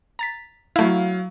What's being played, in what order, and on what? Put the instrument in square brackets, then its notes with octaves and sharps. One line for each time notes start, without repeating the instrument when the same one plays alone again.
[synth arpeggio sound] A#5 A6 B6
[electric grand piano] F#3 F5 [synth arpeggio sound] A3 E4